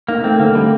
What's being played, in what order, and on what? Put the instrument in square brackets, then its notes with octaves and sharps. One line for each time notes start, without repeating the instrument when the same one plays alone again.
[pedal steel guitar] A#3 [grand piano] D#4
[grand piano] A3 [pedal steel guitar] C4
[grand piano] D3 [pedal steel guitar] A#3
[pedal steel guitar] G3 [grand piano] A3